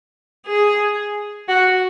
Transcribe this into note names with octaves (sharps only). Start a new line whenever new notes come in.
G#4
F#4